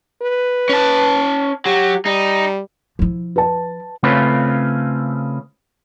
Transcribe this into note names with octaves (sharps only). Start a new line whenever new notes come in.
B4
C#4 A5
F#3 G4
G3 D#4
F3 E4
B4 A5
C#3 A3 C4 C#4 F4 B4